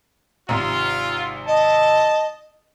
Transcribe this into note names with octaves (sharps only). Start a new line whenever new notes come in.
G#1 C3 F4 A#5
D#5 A5